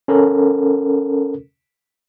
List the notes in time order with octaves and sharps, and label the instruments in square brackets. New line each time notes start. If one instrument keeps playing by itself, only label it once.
[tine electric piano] C#4 A4 A#4